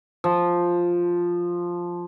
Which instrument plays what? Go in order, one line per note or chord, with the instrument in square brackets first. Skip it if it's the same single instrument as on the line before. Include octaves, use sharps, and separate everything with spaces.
[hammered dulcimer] F3